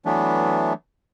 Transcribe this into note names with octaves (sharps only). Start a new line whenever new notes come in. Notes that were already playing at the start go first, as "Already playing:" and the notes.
E3 F#3 A3 B3 D4